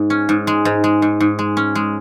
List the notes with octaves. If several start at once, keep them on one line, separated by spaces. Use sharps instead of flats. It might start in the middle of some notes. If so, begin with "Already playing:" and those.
Already playing: G#2
C#4
G#2
G#3
G#2
G#3
G#2
G#2
G#3
C#4
G#3